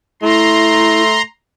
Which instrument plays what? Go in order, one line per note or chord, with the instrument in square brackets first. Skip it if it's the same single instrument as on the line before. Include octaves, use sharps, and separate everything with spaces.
[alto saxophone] A3 [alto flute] E4 [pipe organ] A#5 C6